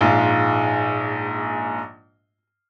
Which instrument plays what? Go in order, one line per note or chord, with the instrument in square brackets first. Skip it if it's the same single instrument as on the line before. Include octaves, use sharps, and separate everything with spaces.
[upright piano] A#1 G#2 G#3 F4